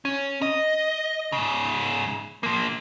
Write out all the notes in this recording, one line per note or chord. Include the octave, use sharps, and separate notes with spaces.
C#4
D#5
G#2 C#3
F3 A#3